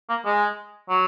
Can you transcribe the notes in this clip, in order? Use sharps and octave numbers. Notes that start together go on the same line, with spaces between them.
A#3
G#3
F#3